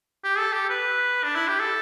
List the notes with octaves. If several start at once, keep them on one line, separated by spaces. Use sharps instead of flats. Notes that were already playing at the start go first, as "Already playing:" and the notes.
G4
A4
G4
B4
D4
E4
G4
A4